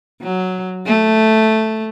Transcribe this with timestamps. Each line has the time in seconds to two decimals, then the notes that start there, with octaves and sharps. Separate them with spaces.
0.21 F#3
0.86 A3